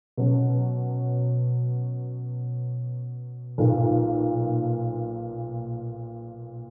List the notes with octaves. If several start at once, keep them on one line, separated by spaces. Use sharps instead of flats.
B2 F#3 C#4
B1 A#2 A#3